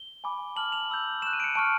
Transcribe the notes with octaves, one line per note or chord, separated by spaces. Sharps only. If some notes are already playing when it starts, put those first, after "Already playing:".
Already playing: G7
G#5 B5 D6
A5 D6 F6 F#7
F7
B5 E6 G6
C#6 F#6 E7
D#7
D7
C#7
A5 C#6 F6 D7